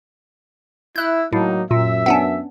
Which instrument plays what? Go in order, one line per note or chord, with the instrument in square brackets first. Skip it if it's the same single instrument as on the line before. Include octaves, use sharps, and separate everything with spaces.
[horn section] E4 [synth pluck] F#6 G6
[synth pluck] A2 [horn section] F#3 A#3 D#4
[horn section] F#2 E5 [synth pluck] A#2
[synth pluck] B3 C#4 D4